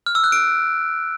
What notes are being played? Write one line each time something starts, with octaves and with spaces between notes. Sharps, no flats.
F6
E6
F#6
D7